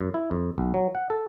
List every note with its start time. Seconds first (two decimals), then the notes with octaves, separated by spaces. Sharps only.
0.01 F#2
0.14 E4
0.31 F2
0.58 B1
0.74 F#3
0.95 F#5
1.10 A4